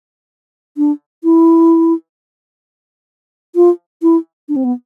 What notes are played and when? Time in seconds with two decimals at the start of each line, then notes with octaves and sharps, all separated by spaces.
0.77 D4
1.24 E4
3.56 F4
4.02 E4
4.49 D4
4.56 C4
4.64 B3